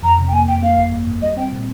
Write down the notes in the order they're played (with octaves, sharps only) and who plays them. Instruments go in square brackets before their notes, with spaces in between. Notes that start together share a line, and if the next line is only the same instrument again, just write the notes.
[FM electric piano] F2 [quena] A#5
[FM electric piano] C3
[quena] G5
[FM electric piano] A#3 [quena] G#5
[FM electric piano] F2 [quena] G5
[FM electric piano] A#3 [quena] F5
[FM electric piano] G1
G2
G2
[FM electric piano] G3 [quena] D#5
[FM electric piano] C4 [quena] G5
[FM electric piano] A#2